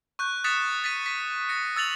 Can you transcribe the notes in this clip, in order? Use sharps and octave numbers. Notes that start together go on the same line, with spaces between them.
C#6 F#6 G6
D#6 F#6 A6 B6 C#7 E7
A6 B6 D#7
B6
A#6 C#7
E6 A6 F7 F#7